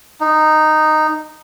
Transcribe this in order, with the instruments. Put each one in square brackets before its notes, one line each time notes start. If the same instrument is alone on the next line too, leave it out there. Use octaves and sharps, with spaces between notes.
[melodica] D#4